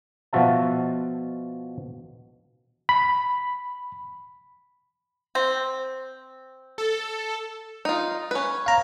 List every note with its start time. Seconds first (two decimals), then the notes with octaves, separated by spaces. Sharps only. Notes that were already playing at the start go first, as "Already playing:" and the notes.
0.33 B2 F3 F4 F#4 E5 A5
2.89 B5
5.35 C4
6.78 A4
7.85 D#4 F4
8.31 C#4 B4
8.66 F5 A#5